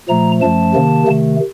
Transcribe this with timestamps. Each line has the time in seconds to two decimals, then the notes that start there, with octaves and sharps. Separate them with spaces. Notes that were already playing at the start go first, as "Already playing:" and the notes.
0.09 A#2 F3 A3 A#5
0.41 F#2 F3 A3 A5
0.74 C3 D#3 A#3
1.07 C3 D#3 A3